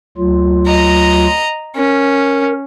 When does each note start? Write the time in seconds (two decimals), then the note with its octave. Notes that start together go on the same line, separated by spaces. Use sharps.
0.18 D2 F#3 F4
0.66 D#5 A#5
1.76 C#4 A#4